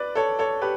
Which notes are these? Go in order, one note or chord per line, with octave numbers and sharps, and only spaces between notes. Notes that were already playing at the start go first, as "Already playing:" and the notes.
Already playing: B4 D5
A4 C#5
A4 C#5
G4 B4